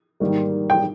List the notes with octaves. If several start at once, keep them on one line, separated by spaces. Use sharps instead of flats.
G#2 D#3 G3 A#3
G5